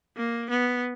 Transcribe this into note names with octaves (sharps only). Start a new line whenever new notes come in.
A#3
B3